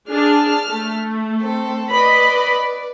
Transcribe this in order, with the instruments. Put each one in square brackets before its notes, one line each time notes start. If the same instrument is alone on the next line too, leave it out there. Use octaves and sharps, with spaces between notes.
[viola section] D4 G#4 [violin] A5 F6
[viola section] A3
[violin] C4 A4
[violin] B4 D5 [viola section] D#5 B5